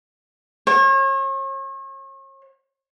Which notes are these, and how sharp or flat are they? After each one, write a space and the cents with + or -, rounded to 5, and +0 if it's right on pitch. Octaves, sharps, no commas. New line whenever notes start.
C#5 -40